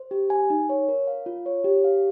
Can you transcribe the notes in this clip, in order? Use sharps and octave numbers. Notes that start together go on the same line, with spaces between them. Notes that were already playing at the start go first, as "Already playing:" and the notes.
Already playing: C5
G4
G#5
D#4
C#5
A#4
F5
F4
C#5
G4
F5